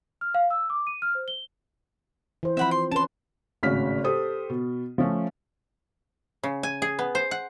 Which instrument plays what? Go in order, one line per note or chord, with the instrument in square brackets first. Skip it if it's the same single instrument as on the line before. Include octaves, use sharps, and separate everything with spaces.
[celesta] F6
F5
E6
D6
D#7
F6
C5
G7
[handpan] E3 C5
[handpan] F3 C4 [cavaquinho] E5 F#5 B5
[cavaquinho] C6
[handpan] C#4 B4 [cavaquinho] A5 C6
[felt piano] G#1 A2 C#3 F#4 F6 B6
G4 A4 C5 D#6
B2
F3 A3 C#4
[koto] C#3
G#5
G#4
B3
C5
F#5